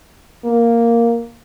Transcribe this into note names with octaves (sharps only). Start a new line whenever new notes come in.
A#3